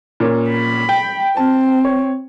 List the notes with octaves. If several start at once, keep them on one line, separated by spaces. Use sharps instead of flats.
A#2 C#4
B5
G5
C4 A5
C#5